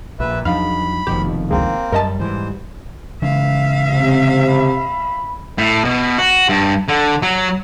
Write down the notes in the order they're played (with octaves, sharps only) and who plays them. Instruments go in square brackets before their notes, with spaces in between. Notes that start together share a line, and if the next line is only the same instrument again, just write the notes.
[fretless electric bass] A#1 A#2 [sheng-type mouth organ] B4 E5
[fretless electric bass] E2 F3 D4 [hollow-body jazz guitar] F#3 D#4 [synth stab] F5 [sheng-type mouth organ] B5
[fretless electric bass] F1 F2 [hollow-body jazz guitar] B2 D#3 F3 [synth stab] G4
[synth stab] D2 G#3 [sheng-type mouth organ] A#3 C4
[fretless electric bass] F#2 [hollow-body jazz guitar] G3 G4 [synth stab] A#4 D#5 A5
[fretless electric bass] G#2 E3 [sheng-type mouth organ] C5
[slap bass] C#3 E3 G#3 [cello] E5 F5
[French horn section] C3
[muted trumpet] B5
[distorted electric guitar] A2
B2
F#4
G2
D3
F#3